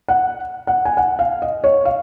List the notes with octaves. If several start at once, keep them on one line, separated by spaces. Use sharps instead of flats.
F#5
F#5
G#5
F#5
F5
D#5
C#5
F5